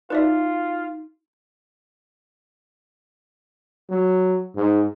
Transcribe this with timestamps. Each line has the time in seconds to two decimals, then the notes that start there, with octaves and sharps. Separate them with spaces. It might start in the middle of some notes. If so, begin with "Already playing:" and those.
0.10 D#4 F4 F#4 B4 D5 E5 D6
3.90 F#3
4.56 G#2